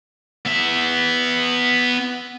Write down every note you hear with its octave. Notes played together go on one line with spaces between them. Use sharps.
B3 E5